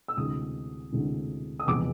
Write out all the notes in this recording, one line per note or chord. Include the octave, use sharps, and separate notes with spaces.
E6
D2 C3 E3 G#3 D#6
D2 C3 E3 G#3
D#6
F1 E2 B2 G#3 D6